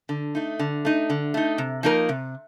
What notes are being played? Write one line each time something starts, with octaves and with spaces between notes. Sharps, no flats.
D3
A3 D#4
D3
A3 D#4
D3
A3 D#4
C3
F3 A#3 D#4 A#4
C3